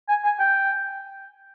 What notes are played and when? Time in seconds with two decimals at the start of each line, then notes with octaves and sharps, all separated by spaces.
0.09 G#5
0.24 G#5
0.39 G5